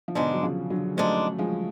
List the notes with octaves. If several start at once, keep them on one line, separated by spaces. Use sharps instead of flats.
F3
G#2 B2 D3 G#3 D4
F#3
C#3 F3
D3 F#3
G#2 F#3 G#3 A3 D4
F3 G#3